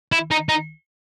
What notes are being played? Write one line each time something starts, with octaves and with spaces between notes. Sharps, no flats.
E4
D#4
D#4